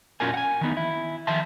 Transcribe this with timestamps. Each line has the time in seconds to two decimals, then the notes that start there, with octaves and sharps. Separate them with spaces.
0.20 A#2 C#4 F4 F#4 A#4 G#5
0.34 F#5 G#5
0.61 D#3 E3 B3 D#4
0.77 E4
1.27 D#3 F3 E5 A5 C6